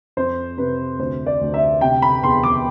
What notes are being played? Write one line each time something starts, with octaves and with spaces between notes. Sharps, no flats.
F2 C5
C3 B4
D2 C5
D5
D2
E5
C3 G5
B5
E2 C6
D6